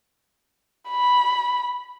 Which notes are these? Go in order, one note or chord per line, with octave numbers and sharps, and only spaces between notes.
B5